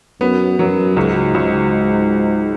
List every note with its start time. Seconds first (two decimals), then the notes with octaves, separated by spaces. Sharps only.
0.21 F#2 B3
0.59 F#2 F#3
0.97 C#2 G#2
1.35 C#2